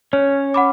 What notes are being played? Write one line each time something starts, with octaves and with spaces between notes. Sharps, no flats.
C#4 C#5
F#5 B5 D6